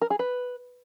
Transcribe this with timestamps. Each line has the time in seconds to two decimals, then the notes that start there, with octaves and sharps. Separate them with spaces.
0.02 A#4
0.10 G#4
0.19 B4